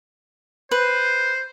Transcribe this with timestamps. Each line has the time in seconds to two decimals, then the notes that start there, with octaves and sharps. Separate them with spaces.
0.71 B4 C5